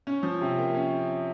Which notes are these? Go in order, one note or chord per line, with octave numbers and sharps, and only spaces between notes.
C#4
F3
C3
A#3
C#4